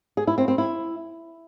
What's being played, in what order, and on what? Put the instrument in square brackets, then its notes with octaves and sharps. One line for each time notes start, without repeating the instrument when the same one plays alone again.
[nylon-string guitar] G#4
E4
C4
C4
E4